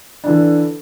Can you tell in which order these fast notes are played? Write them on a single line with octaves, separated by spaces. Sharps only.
D4 E3 D3